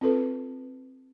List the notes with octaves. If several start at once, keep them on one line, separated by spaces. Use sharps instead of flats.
C4 F4 A4 B4